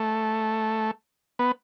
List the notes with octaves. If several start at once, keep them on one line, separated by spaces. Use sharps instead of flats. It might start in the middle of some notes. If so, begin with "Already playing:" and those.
Already playing: A3
B3